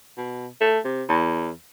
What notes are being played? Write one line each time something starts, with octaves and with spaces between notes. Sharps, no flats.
B2
A3
C3
E2